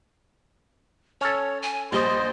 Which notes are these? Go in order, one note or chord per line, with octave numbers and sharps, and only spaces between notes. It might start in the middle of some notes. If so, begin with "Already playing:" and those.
C#4 A4 C#5
G#5
A#1 G3 C5 D#5 D#6